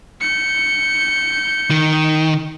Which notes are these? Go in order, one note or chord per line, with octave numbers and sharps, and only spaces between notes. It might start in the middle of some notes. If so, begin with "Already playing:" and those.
G6 C#7
D#3